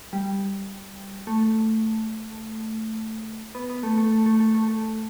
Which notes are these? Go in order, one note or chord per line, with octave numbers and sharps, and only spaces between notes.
G3
A3
B3
B3
A3
A3
A3
A3
A3
A3
A3